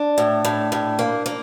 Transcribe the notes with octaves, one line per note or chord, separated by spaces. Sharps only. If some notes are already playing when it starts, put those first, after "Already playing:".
Already playing: D4
A2
A2
A2
A#3
A#3